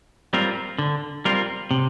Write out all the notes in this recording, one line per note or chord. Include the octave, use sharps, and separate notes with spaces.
G3 C4 F4 A#4
D3
G3 C4 F4 A#4
C3